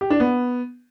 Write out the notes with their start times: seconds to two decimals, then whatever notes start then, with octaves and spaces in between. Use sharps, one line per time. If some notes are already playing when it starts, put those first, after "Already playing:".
0.01 G4
0.10 D4
0.20 B3